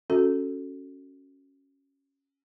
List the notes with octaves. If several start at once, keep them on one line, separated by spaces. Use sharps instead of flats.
C#4 F#4 A4